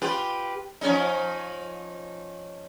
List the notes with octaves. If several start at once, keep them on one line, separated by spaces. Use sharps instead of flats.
F4 G4 B4
F3 C#4 D#4